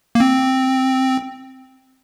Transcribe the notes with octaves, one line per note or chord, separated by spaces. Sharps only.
A#3
C4